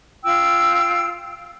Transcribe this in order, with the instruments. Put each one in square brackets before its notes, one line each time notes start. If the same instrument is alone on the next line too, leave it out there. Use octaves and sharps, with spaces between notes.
[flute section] F4 G5 E6